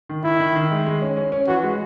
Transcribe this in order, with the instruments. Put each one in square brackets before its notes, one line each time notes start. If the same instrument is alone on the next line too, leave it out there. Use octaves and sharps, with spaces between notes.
[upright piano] D#3
[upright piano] D#3 [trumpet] E4
[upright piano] D#3
D#3
G#3
G#3
C#4
C#4
C#4
[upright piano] E3 [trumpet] F#4
[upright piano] G#3